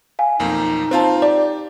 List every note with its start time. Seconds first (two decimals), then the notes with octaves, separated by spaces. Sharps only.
0.19 F5 G#5
0.39 B1 F2 A#3 D#4
0.91 C4 F4 C5 F5 A5
1.22 G4 D5